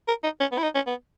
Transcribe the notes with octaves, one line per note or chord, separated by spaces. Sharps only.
A#4
D#4
C#4
B3
E4
D#4
C#4
B3